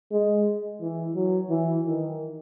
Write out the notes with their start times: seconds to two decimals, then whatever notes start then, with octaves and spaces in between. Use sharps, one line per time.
0.12 G#3
0.81 E3
1.16 F#3
1.50 E3
1.84 D#3